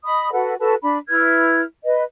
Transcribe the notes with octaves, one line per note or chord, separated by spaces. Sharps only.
D#5 B5 D#6
F#4 A4 B4 F#5
F#4 A4 B4 A5
D4 B5
E4 B4 F6 G#6
B4 D#5